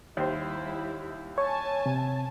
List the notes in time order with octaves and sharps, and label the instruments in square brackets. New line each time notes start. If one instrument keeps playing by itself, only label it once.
[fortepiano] D#2 C5 [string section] G3 E4
[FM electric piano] C#5 [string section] G#5 A5
[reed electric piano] C3